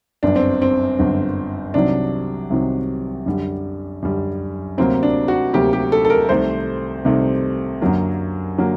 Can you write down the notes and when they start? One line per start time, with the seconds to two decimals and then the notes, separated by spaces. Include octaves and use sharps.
0.23 G1 F#2 D3 D4
0.36 C4
0.62 C4
0.99 G1 F#2 D3
1.74 C2 C3 D#3 F#3 D4
2.50 C2 C3 D#3 F#3
3.26 F#2 D3 G3
4.02 F#2 D3 G3
4.77 D2 C3 F#3 A#3 C4
5.03 D4
5.28 F#4
5.53 D2 C3 F#3 A#3 G4
5.73 G4
5.92 A4
6.05 A4
6.10 A#4
6.29 C2 C3 D#3 A3 C5
7.05 C2 C3 D#3 A3
7.81 F#2 D3 F#3 A#3
8.58 D3 F#3 A#3